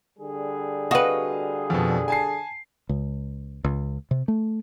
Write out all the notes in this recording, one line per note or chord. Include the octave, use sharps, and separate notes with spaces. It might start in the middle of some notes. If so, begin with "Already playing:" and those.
D3 G3 G#4
F#4 B4 D#5 F5 D#6
F2 B2
G#5 A5 C7
C#2
C#2
C3
A3